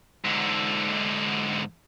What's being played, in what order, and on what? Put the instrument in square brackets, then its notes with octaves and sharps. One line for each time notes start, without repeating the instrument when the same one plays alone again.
[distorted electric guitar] G#2 D3